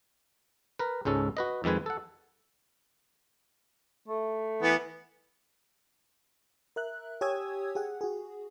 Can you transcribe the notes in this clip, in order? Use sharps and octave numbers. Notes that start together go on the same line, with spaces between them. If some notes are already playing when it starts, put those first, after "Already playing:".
A#4 B4
C#2 G#2 C#4 A4
F#4 B4 D#5
F2 D#3 G#3 B4 G#5
A4 F#5
A3
E3 B3
A#4 E5 F#6
G4 C#5 G#5 D#6 E6 G#6
G4 G#4 F#5
F#4 G#4